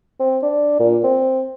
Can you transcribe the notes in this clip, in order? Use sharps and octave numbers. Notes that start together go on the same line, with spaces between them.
C4
D4
A#2
C4